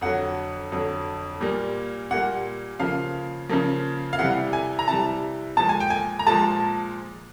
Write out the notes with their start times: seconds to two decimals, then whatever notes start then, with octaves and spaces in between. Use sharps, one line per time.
0.01 F2 D3 F#3 F#5
0.72 F2 D3 F#3
1.41 A#2 G3 A#3
2.11 A#2 G3 A#3 F#5
2.80 C#3 F3 A#3 F5
3.50 C#3 F3 A#3
4.13 F5
4.19 C3 E3 G3 F#5
4.53 G#5
4.79 A#5
4.88 C3 E3 G3 A5
5.57 A#2 F3 G#3 A5
5.69 G#5
5.80 G5
5.90 G#5
6.19 A#5
6.27 A#2 F3 G#3 A5